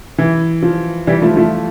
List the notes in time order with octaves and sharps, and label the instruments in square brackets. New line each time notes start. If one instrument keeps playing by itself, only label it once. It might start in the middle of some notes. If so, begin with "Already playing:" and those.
[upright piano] E3
F3
E3 G3
F3 A3
F3 A3